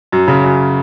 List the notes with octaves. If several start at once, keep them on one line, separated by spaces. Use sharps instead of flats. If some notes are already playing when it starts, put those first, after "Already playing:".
F#2
C#3
F#2